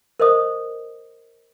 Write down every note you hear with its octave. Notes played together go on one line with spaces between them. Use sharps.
A#4 C5 D#5 D#6